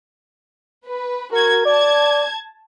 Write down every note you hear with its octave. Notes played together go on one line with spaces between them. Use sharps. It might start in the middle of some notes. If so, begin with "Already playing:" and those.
B4
F#4 A#4 G#6
D5 A5 G#6